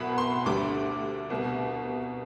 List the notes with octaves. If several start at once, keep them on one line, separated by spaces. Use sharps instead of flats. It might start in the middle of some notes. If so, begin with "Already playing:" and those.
Already playing: C2 B2 F#3 F#5 B5
C6
D2 D3 G3 D6
C2 B2 G3